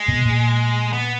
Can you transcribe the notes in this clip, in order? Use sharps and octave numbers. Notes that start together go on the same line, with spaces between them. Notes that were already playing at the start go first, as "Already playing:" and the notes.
Already playing: G#3
B2
A#2
B3